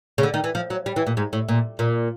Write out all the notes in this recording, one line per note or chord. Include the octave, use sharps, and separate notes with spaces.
C#3
D3
D#3
E3
F3
F#3
G3
E3
A#2
G#2
A2
A#2
A#2